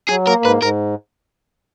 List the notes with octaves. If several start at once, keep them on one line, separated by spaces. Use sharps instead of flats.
F#3 G#4
A#3 A#4
G#2 B4
G#2 A#4